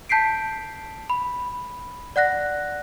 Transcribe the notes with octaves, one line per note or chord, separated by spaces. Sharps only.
A5 G6 B6 C7 D7
B5
D5 F#5 F#6 A#6